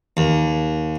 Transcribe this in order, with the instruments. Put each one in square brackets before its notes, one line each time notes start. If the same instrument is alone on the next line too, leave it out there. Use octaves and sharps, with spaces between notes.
[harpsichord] D#2